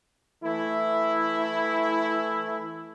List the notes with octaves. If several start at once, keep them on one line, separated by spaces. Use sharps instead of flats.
E3 A3 E4